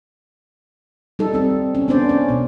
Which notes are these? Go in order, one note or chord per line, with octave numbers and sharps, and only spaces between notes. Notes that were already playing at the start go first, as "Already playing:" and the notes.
G3 D#4 A4
C4 A4
C#4
B3 C#4 D4 C5 D5
C#4
B2 B3